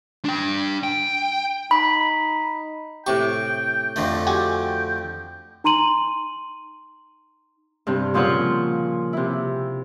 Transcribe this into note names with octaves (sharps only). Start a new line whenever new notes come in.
D4 G5
G5
D#4 B5
A2 C3 G4 G5 C#6
F2 D3 A3
F#4 G4 G5 G#5
D#4 A#5 C6 D#7 F#7
G2 C3
A#2 C#3 F3 F4 C#5 F#5
C3 E4